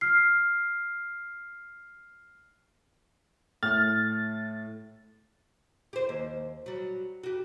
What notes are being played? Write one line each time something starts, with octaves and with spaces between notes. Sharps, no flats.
F6 C7
A2 F6 A6
G4 C5
D#2
F#3 G3
F#4 G4